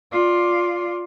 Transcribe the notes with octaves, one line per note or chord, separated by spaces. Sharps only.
F4 D5